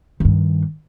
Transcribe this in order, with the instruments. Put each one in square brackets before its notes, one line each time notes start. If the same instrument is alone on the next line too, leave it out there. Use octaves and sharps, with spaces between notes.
[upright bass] G2 D#3